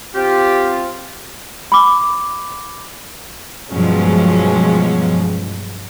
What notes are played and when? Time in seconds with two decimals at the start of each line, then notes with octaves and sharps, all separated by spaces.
0.15 C4 F4 G4
1.72 B5 D6
3.71 G2 B2 F3 F#3 G#3 C#4